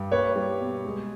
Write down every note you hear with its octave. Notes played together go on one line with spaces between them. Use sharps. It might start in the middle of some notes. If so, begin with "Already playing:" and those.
Already playing: G2
A#3 B4 C#5
G3
B2
G#3